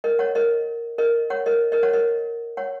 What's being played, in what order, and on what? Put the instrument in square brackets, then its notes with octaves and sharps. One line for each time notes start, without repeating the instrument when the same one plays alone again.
[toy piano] A#4 D#5
C#5 F#5
A#4 D#5
A#4 D#5
C#5 F#5
A#4 D#5
A#4 D#5
C#5 F#5
A#4 D#5
C#5 F#5